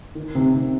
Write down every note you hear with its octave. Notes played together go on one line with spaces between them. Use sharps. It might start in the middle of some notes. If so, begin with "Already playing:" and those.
D#3
C3
C3